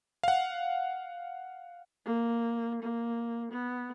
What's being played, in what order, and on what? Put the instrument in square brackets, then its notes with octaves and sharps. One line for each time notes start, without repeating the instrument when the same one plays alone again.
[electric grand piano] F5 F#5
[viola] A#3
A#3
B3